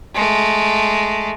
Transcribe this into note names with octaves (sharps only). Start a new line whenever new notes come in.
G#3 A3